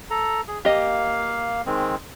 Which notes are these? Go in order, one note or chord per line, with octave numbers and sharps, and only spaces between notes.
A4 A#5
G#4
A#3 G4 D#5 F5
D#3 G#3 C4